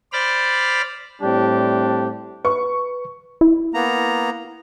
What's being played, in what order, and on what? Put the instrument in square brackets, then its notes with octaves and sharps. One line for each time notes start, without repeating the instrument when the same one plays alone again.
[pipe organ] C5 D5 B5 F6
[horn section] A2 G3 C4 D4 G4
[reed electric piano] B4 [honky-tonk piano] C#6
[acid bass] E4
[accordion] A#3 B3 A#5